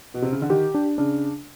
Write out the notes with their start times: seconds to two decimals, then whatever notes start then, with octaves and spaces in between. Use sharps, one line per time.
0.14 B2
0.22 C3
0.32 C#3
0.41 D3
0.49 D#3 G4
0.74 D4
0.98 C#3 D4